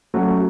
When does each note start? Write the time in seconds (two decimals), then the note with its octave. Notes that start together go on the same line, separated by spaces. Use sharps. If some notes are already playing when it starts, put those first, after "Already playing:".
0.14 F#3 A3 C#4 F#4